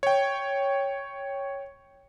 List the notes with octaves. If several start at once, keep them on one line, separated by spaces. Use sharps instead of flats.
C#5 G5